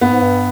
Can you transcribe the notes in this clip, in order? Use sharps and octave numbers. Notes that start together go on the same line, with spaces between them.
G2 B3
G#2
G2